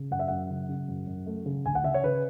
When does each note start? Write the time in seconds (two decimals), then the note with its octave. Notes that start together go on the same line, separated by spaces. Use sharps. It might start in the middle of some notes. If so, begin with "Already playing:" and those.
Already playing: C#3
0.11 F#2 F#5
0.19 E5
0.28 F#2 F#5
0.50 C#3
0.69 C#3
0.88 F#2
1.07 F#2
1.26 A3
1.46 C#3
1.66 D2 G#5
1.75 F#5
1.84 C#3 E5
1.94 C#5
2.03 C#3 B4